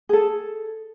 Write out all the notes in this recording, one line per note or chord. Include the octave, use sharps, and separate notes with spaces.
G#4 A4